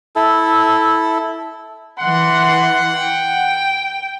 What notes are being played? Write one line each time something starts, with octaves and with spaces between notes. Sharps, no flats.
E4 A4
E3 F#5 C6
G5